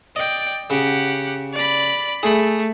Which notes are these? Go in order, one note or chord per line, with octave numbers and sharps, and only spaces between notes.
D5 D#5 G5
C#3 G4 F#5
D5 B5
A3 G#4 B5